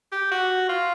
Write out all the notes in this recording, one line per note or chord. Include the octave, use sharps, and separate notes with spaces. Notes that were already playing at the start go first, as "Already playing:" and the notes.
G4
F#4
F4